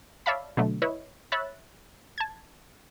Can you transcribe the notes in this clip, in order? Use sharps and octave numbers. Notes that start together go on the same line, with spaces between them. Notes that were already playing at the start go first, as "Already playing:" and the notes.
C#5 D5 E5 F5 A5 B5
B2 D3 F#3 A3
E4 B4 C#5 D#5
C#5 E5 B5 E6 F#6 A6
A5 G#6